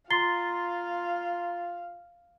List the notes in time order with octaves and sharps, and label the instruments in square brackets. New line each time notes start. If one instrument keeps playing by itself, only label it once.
[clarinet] F4 [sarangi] F5 [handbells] A#5 C6 [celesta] A6 C7 G7